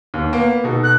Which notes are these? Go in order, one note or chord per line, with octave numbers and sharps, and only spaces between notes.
D#2
A#3 B3 D7
B2 D#4 A4
F#6